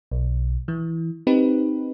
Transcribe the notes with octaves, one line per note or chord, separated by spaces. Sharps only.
B1
E3
C4 D#4 G4 B4